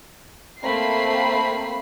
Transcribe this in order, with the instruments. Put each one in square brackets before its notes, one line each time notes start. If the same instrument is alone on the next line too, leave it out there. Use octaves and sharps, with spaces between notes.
[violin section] A3 A#3 C4 B5 C7